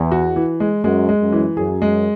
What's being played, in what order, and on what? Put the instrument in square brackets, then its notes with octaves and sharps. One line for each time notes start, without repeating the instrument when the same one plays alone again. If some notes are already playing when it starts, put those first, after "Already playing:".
Already playing: [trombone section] E2
[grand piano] F#4
E3
G#3
[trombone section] F#2 [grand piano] G#3
[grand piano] G#3
[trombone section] F#2
[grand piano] E3
[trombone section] F#2 [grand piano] G#4
[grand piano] G#3